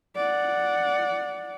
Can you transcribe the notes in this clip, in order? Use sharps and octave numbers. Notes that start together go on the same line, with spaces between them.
D5 F#5